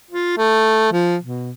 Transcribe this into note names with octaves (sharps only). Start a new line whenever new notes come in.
F4
A3
F3
B2